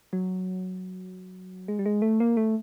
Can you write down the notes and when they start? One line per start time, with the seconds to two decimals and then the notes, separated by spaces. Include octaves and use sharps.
0.13 F#3
1.68 G#3
1.79 G3
1.86 G#3
2.02 A3
2.20 A#3
2.37 A3